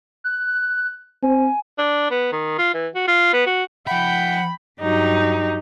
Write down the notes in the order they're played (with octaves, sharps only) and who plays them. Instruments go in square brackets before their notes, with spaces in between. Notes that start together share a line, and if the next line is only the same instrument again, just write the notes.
[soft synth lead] F#6
[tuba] C4 [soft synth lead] G#5
[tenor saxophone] D4
B3
D#3
F4
E3
F#4
F4
B3
F#4
[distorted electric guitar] F3 E5 [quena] F#5 [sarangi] G5 [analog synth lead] B5
[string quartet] G2 F#3 [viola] D#4 G4